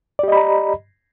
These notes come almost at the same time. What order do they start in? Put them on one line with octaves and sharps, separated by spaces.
D5 G4 D#5 B5 A#5